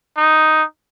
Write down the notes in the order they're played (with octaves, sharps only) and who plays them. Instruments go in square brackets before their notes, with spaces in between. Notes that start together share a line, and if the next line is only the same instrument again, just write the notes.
[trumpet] D#4